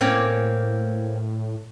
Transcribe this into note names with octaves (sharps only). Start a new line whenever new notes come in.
A2 A#3 C4 C#4